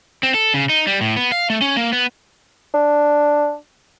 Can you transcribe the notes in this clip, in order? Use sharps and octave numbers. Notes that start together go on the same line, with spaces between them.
C4
A4
C#3
D#4
G3
A2
B3
F5
A3
C#4
A#3
B3
D4